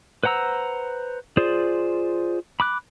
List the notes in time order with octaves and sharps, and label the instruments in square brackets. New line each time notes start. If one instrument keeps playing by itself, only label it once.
[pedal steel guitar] B4 C5 F#5 A#5 E6
F4 G#4 C5 D5
B5 D6 F#6